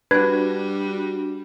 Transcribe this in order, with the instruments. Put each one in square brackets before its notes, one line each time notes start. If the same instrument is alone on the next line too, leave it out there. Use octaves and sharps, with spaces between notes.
[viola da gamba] G3 [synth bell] D4 F#4 [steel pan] B4 [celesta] G#6